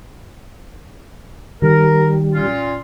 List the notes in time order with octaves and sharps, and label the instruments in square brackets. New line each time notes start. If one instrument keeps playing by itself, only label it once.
[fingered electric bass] D#3 [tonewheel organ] G3 [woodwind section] A#4
[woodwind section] A#2 C#4 F4